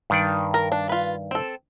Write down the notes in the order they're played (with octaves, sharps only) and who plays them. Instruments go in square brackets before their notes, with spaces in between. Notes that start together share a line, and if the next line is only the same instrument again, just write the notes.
[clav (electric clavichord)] G2 D#3 D5
[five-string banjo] A#4
D4
F4 B4
C4 A4